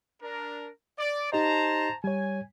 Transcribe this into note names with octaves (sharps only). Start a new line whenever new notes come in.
D4 A#4
D5
D#4 G4 C5 D#5 A5 A#5
G3 C#5 G#5